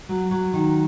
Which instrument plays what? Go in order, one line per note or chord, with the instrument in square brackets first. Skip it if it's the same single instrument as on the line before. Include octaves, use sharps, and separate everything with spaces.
[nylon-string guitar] F#3
F#3
D#3